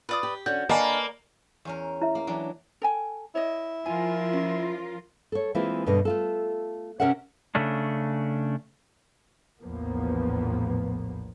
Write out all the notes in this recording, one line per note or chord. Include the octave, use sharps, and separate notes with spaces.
F4 B4 D5 D#6
G4
D3 C#4 F#4 G6
D3 A#3 A4 B4 C#5 D#5 G#5 B5
E2 C#4 A#4
E4 E5
A#3
E3 F#3 D4
A4 G5 G#5
E4 C#5 D#5
F3 F4 A#4 G#5
C#4
A4 C#5
E3 G#3 A#3 C4 E4 F4
G2 B2 D3 D#5
A3 F4 A4
C3 C#4 A#4 E5 F#5
C#3 A3 C#4 D4
A#1 E2 A2 F3 A#3 B3